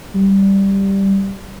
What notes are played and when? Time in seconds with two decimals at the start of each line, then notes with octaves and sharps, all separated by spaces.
0.14 G3